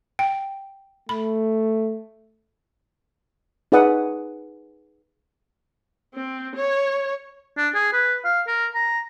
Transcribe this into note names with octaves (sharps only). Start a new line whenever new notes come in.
G5
A3 B5
D#4 G#4 B4 D5 F#5 D#6
C4
C#5
D4
G#4
B4
F5
A#4
A#5